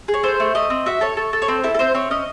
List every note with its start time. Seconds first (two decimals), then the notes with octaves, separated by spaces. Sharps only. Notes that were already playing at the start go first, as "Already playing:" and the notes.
0.08 G#4
0.14 C#5
0.23 A3 C5
0.40 A3
0.55 A3 D#5
0.70 C4
0.86 F#4 E5
1.01 A4 C#5
1.17 A4
1.33 A4
1.42 C#5
1.48 C4 C5
1.64 E4 A4
1.74 A4
1.79 C4 C5
1.94 C4 C#5
2.11 C#4 D#5